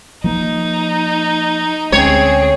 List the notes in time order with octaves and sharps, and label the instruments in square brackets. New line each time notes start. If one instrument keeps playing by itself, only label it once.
[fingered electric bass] F3 A#3 [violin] D#4
[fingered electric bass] D2 G#3 C#4 [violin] C4 G#4 [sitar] C#5